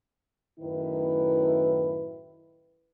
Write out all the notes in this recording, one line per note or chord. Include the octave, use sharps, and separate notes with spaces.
F#2 A2 D#3 E4 B4